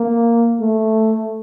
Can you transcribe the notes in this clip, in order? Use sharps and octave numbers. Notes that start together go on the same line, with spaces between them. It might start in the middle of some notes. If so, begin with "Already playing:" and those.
Already playing: A#3
A3